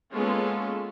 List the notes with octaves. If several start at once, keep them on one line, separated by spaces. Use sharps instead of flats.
G#3 A#3 B3 C#4 F4 A4